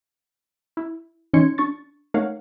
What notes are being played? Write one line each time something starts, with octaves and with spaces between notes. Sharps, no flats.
E4
E3 C#4 D#4 C6 G#6 C#7
D4 C#6 A6
A3 D#4 A#4 C#5 F5 F#5